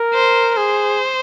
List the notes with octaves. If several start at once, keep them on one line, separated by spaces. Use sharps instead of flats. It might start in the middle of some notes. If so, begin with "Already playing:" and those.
Already playing: A#4
C5
G#4 C5